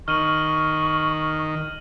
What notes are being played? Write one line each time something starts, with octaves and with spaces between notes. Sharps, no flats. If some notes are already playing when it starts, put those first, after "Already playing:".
D#3 C#6 F6 D#7 F#7